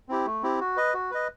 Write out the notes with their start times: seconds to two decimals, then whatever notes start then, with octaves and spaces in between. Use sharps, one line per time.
0.09 C4 E4 G4
0.26 A3
0.43 C4 E4 G4
0.60 F#4
0.77 B4 D#5
0.94 F#4
1.11 B4 D#5